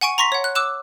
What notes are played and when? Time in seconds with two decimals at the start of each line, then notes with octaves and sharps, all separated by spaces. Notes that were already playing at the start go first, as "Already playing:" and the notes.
0.01 F#5 G#5 C#6 D7
0.18 A#5 C6 C#6 A#6 B6
0.32 C#5 F#5
0.44 F#6
0.55 D6 E6 F#6 E7